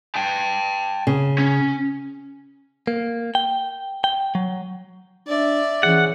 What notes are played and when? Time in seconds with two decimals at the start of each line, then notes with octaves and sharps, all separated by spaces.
0.16 G5 A5
1.07 C#3
1.38 C#4
2.87 A#3
3.35 G5
4.04 G5
4.35 F#3
5.27 D4 D5 E5
5.83 E3 C#4 G#4 F#5